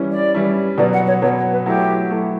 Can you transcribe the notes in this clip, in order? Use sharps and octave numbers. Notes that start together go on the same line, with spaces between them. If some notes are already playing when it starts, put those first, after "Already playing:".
Already playing: E3 G3 C#4 E4
D5
E3 G3 C#4 E4
B2 F#3 B3 D5
F#5
C#5
B2 F#3 B3 C#5
C#5
B4
F#3 A3 E4 G4
F#3 A3 E4